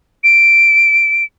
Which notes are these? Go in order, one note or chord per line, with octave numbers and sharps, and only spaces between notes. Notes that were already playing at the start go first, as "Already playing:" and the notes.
D7